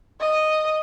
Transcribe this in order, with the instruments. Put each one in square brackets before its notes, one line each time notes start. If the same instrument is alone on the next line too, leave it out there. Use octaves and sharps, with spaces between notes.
[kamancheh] D#5